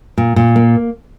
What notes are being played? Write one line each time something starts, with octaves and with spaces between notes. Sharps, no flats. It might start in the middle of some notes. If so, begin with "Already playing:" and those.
A#2
A#2
A#3